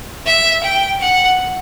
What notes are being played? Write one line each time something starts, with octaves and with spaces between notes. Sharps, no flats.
E5
G5
F#5